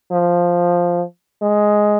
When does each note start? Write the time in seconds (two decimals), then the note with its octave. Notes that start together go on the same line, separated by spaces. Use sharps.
0.11 F3
1.42 G#3